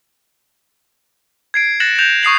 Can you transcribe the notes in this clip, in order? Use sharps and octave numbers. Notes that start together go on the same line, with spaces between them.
G#6 C7 D7
F#6 A6 A#6 C#7 E7 F#7
G6 E7 F7
C#6 D#6 C7 F#7